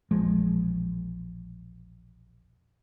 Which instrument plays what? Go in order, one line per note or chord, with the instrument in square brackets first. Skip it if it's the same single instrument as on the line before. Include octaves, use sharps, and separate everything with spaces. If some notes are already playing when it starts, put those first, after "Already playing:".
[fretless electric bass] E1 A#1 F3 G#3